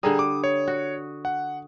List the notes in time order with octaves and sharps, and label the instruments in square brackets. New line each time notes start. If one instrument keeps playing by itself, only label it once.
[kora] D3 G3 [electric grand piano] G#4 A#5 D#6
[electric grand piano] D6
C#5
[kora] F#4
[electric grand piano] F#5